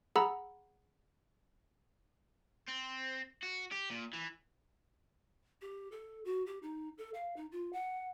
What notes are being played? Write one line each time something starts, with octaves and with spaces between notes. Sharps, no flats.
G#4 F#5 A#5 B5 E6
C4
F#4
G4
A#2
E3
G4
A4
F#4
G4
D#4
A4
F5
D#4
F4
F#5